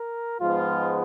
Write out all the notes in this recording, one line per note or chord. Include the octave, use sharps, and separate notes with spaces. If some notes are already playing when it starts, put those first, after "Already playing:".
Already playing: A#4
G#2 F3 G#3 B3 F4